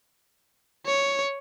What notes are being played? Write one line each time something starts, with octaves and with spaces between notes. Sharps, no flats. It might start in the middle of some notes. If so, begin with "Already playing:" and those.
C#5